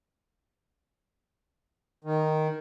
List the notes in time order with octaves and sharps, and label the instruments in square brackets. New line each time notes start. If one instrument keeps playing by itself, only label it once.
[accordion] D#3